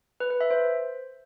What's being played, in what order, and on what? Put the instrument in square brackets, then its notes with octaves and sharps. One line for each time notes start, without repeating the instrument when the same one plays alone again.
[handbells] B4
B4
E5
C5